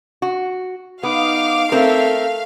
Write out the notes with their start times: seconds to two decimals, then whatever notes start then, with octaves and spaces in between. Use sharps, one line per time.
0.22 F#4
1.03 B3 D#4 F5 D6
1.72 A3 C4 A4 A#4 E5